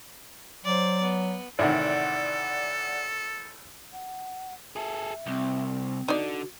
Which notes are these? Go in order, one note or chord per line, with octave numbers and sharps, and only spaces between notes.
F#3 C5 D5
B3
A1 C3 D#3 A4 D5 F#5
F#5
G#4 A4 E5
C2 C4
D3 D#4 F#4 D5